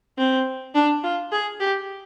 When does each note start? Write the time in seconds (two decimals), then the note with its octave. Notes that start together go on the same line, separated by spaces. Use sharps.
0.18 C4
0.75 D4
1.04 F4
1.32 G#4
1.60 G4